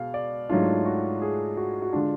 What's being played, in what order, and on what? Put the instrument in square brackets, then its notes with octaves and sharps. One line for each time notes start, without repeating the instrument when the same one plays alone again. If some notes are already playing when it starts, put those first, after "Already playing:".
Already playing: [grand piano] B2 G#3 F5
D5
G#2 F#3 A3 D4 F4
F#4
G#4
F#4
F#4
D3 G#3 D4 F4